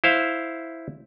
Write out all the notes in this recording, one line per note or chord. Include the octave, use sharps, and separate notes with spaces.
E4 C5 F5